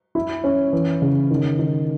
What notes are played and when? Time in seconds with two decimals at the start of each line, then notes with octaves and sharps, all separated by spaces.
0.15 E4
0.44 C#4
0.73 E3
1.02 C#3
1.30 D#3
1.59 D#3